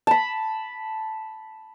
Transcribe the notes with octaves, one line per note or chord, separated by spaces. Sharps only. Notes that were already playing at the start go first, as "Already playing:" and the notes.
A5 B5